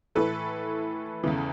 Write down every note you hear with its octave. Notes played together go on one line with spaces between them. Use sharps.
A2 E3 A4 B4
E2 C#3 E3